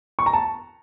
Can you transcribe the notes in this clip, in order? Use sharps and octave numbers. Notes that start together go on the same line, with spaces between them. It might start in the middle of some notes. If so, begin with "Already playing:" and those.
C#6
A#5
A5